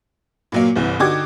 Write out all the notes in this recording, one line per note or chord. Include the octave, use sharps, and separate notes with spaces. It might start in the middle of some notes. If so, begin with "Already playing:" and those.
A#2 F#3 A#3
G1 C2 E3
D3 D#4 F#4 G4 D6 G#6